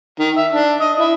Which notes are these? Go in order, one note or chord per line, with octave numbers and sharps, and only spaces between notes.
D#3
E5
D4
D#5
E4